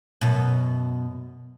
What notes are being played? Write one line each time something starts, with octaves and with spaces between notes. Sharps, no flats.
F#2 B2